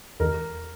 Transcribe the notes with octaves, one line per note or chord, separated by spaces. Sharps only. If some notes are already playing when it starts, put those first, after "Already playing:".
E2 A#4